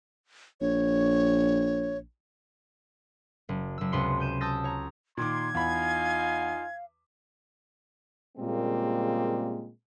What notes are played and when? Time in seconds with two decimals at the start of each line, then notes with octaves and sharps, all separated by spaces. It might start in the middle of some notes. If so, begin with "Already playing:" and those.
0.61 A#1 C#5
3.49 F#1
3.78 F#1 E6
3.92 C#2 C3 B3 C6 C#7
4.20 G6 D#7 E7
4.41 A5 D#6 E6 G6 A6 A#6
4.64 C#5 A#5
5.17 A#2 D#3 C6 D6 G#6
5.55 E2 D#4 F4 F5 G#5 B5
8.37 A#2 C#3 G3 G#3 A#3 C4